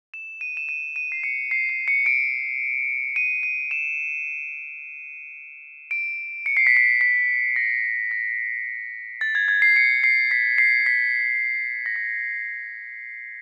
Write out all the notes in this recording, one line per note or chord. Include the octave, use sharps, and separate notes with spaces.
E7
D#7
E7
D#7
D#7
C7
C#7
C7
C7
C#7
D7
D#7
D#7
E7
D7
C#7
C7
B6
C7
B6
A#6
A#6
A6
G#6
G#6
C7
C#7
C7
B6
C7
B6
A#6
B6